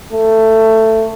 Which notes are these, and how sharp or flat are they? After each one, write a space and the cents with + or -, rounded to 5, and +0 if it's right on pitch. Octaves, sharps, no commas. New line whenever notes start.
A3 +15